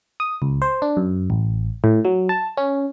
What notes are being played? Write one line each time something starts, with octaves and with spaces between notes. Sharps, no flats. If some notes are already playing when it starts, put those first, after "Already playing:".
D#6
C#2
C5
D4
F#2
A1
A2
F#3
A5
C#4